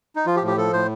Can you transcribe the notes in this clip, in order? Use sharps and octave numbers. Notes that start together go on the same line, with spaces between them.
D#4
F3 F4
G4
A2
G4
F3 A4
A2 C5